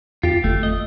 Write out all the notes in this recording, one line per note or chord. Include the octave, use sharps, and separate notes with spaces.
F2 F4 G4
G1 A3
D#5